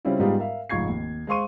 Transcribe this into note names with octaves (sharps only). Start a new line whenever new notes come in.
C#3 G3 C4 C#4 E4 F4
G#2 G3 G#3 B3 F4 G4
A#4 E5 F5
F1 G#2 F4 C#6 G#6 C7
D#2
G#3 C5 F5 C6 C#6 D#7